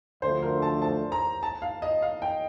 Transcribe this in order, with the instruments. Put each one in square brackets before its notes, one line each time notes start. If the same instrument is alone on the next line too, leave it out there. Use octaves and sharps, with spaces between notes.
[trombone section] D2 D3 F3 A3 D4 [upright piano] C5
[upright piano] A#4
A5
A5
A#5
A5
F5
D#5
F5
G5